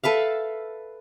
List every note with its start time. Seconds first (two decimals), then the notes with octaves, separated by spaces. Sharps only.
0.04 A4 B4 E5 F5